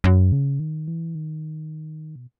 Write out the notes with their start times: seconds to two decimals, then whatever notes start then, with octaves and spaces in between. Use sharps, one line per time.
0.04 F#2
0.32 C#3
0.60 D#3
0.88 E3
1.15 D#3
2.16 B2